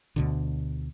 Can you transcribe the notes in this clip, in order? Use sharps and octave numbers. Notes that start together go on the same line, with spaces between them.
D2 B2 D3